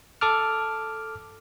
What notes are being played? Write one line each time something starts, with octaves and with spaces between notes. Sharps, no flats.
A4 A5 D6 F6